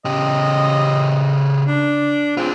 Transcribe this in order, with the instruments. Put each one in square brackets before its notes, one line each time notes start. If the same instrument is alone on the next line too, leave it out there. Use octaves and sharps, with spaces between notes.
[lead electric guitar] C#3 G4 [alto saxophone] D#5
[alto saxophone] D4
[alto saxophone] C4 [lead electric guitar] F4 G#4